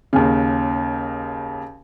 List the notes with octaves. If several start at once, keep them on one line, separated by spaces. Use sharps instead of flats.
D#2 C#3